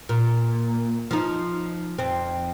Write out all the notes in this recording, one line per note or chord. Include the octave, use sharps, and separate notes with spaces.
A#2
F3 D#4
F2 C4